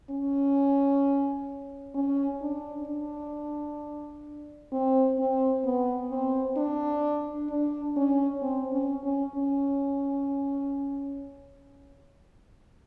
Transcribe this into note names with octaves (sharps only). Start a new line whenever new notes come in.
C#4
C#4
D4
D4
C4
C4
B3
C4
D4
D4
C#4
C4
C#4
C#4
C#4